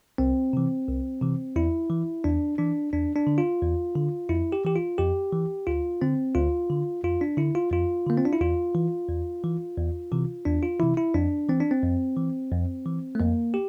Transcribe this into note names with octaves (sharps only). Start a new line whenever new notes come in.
C2 C4
C3 E3
C2
C3 E3
E2 E4
E3
E2 D4
E3 D4
E2 D4
D4
D3
F4
E2
D3
F2 E4
G4
E3 G4
F4
F2 G4
E3
D2 F4
D3 C4
D2 F4
D3
F2 F4
D4
D3 E4
F4
F2 F4
D3 A#3
C4
D4
E4
E2 F4
E3
E2
E3
E2
C3 E3
E2 D4
F4
C3 E3 E4
E4
F2 D4
E3 C4
D4
C4
F2
E3
F2
E3
A3
F2 A#3
G4